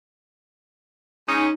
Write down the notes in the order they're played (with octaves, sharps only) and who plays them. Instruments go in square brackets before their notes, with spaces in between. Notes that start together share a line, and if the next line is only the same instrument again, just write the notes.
[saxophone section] G#3 C#4 [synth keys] D#4